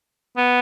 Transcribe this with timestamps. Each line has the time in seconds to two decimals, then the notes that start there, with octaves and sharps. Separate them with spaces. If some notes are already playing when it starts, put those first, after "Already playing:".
0.37 B3